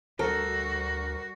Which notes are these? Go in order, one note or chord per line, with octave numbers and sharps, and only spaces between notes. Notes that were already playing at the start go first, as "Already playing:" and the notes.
D2 G3 F#4 A4 A#4